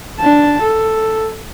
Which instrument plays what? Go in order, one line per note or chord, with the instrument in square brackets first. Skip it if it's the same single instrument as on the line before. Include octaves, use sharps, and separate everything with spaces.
[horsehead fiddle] D4 A5
A4